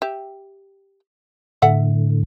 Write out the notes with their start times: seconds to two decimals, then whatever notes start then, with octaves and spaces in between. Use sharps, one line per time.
0.02 G4 E5
1.62 A2 D3 A4 E5 F#5